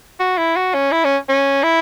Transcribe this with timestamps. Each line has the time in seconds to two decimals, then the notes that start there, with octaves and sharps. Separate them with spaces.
0.20 F#4
0.38 E4
0.56 F#4
0.74 C#4
0.92 E4
1.04 C#4
1.29 C#4
1.63 E4